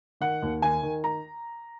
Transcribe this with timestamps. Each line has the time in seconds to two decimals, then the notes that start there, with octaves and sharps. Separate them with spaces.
0.21 D#3 F#5
0.42 D#2
0.62 D#3 G#5
0.83 D#3
1.04 A#5